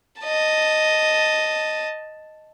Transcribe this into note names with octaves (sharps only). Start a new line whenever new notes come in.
D#5 A5